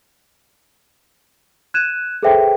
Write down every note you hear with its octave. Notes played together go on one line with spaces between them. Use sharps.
F#6 G#6 D#7 E7
G#4 A4 B4 C5 E5 G5